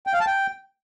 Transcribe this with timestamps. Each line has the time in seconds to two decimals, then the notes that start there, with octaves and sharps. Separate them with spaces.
0.07 G5
0.14 F5
0.20 A5
0.27 G5